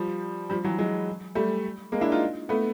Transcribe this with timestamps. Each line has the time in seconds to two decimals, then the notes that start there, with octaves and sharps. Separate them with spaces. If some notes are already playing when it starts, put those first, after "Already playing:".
Already playing: F3 G3
0.50 F3 G3
0.64 E3 F#3
0.78 F#3 G#3
1.35 G3 A3
1.92 G#3 A#3
2.01 D4 E4
2.12 D#4 F4
2.49 A3 B3